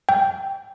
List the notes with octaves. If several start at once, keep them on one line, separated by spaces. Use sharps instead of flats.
G5